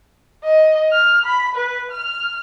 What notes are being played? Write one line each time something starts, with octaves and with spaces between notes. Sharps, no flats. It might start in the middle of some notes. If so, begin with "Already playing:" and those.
D#5
F6
B5
B4
F6